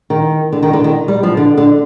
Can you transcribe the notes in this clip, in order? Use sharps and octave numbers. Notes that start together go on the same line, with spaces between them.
D#3
D3
D#3
D3
D#3
G3
F3
D3
D3